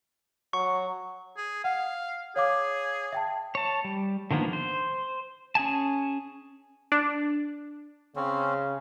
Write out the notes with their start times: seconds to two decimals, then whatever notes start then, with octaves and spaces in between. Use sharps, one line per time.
0.53 F#3 C#6
1.37 G#4
1.64 F5 F#5
2.36 G#4 C#5 F5 D6
3.13 E5 G5 A5
3.55 C#5 A5
3.84 G3
4.31 D3 D#3 F3 A#3 B3
4.53 C5
5.55 C#4 G#4 G#5 A5
6.92 D4
8.16 C#3 C4 C#4